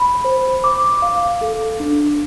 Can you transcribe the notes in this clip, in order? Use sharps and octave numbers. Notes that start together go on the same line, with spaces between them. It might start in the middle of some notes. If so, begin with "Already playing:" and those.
Already playing: B5
C5
D6
F5
A4
D4